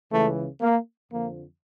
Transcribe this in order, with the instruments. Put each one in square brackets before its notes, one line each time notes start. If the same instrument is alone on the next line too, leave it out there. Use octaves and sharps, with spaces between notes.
[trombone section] C#2 C#3 E3 A3
A#3
F2 D3 F3 A#3